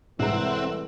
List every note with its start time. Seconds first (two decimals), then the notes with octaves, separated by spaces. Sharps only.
0.20 C2 A2 E3 G#3 C4 E5 F#5 A#5